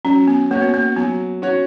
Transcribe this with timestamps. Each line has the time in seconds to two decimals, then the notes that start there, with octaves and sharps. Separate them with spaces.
0.05 F#3 C#4
0.28 B3
0.50 A#3 C#4 F#4 C#5
0.62 B3
0.74 A#3
0.96 F#3 B3
1.42 C#4 F#4 C#5